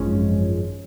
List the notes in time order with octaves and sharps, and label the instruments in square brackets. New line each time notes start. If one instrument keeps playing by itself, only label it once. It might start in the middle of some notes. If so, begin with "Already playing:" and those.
Already playing: [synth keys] G#1 F#2 F3 G#3 C#4